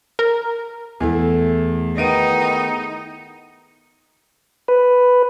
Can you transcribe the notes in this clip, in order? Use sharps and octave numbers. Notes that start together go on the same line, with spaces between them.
A#4
E2 A3 E4 G#4
D#3 B3 D#4 D#5 D7 D#7
B4